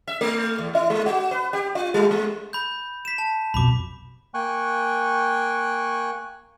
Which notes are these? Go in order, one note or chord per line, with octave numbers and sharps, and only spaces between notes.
E5
A3
E2
E4
G#3
F#4
B4
G4
F4
G3
G#3
B5 G6
B6 E7
A5
B1 F2 B2 B5 D6
A#3 G5 G#5 C#6 F#6